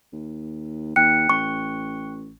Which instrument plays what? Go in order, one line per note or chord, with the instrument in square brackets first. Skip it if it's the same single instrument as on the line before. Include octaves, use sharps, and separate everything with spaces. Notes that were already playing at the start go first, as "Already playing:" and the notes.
[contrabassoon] D#2
[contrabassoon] D#2 [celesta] G5 F#6 [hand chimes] C#7
[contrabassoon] A1 [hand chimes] C#6